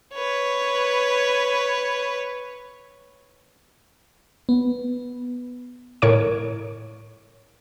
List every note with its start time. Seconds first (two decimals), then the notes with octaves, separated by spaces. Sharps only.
0.14 B4 C#5
4.49 B3
6.02 A2 A#4 C#5 C#6 D7